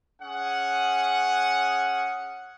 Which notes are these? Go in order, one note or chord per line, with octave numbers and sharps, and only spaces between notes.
C#4 G#4 F#5